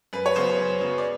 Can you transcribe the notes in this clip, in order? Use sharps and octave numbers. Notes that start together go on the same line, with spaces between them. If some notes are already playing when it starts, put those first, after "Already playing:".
F#2 B4
C#5
C#3 F#3 B3 C5
F#2
C#3 F#3 B3
D5